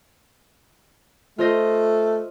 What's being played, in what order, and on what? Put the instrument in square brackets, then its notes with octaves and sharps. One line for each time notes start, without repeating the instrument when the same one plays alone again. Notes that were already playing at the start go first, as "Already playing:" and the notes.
[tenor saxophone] A3 [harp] F4 C5 D#5